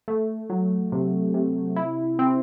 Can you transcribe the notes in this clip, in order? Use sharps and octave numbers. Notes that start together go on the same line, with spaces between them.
A3
F#3
C3
C3
E4
C4